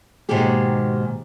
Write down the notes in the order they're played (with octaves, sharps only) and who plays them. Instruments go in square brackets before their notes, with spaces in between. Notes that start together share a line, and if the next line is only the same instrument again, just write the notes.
[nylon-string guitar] D#2 G#2 B2 D#3 G4 G#4